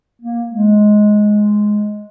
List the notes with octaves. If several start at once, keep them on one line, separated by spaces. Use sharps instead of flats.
A#3
G#3